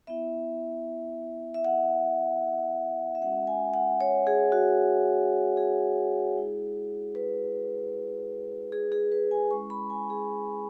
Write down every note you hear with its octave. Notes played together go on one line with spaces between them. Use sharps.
B3 E4 E5
E5
F#5
E5
G#3 C#4 F#4 F#5
G#5
F#5
C#5
G#4
F#4
G#4
G#3 E4
B4
G#4
G#4
B4
G#5
G#3 C#4 E4 C#6
B5
G#5
G#4